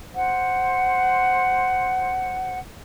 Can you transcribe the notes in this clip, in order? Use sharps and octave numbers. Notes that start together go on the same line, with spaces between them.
C5 F#5